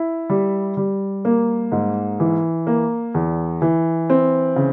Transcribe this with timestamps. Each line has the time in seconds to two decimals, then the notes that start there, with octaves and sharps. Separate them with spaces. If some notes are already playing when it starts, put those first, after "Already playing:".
Already playing: E4
0.30 G3
0.77 G3
1.25 A#3
1.72 G#2
2.20 E3
2.67 A#3
3.14 E2
3.62 E3
4.10 C4
4.56 C#3